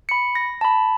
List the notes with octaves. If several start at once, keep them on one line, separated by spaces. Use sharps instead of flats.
B5 C#7
A#6
A5 B5